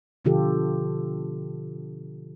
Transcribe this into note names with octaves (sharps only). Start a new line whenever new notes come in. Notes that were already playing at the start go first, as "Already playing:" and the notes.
B2 D3 F3 F4 G4 A4